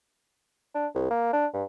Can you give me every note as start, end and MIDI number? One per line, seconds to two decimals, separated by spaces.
0.75 0.87 62
0.95 1.06 36
1.10 1.29 58
1.33 1.47 62
1.53 1.64 43